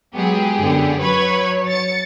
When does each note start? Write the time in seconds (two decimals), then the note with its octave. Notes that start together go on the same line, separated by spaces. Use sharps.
0.15 F#3 G#3 B3 G4 G#4
0.57 F#2 D3 B3
1.00 F#3 B4 C#5 B5 G#6
1.68 A6 C#7